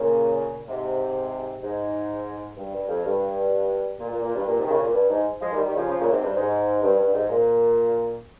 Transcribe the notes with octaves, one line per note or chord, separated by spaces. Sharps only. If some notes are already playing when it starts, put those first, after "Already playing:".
Already playing: A#2 C#3
G#2 C3
G#2
G2
G2
F2
G2
A#2
A#2
A#2
G2
A#2
G#2 C3
D#3
A#2 C#3
A#2
G2
G#2
F3 G#3
D#3 G3
D#3 G3
C#3 F3
C#3 F3
A#2 C#3
G#2 C3
G2
G#2
G2
G2
G#2
A#2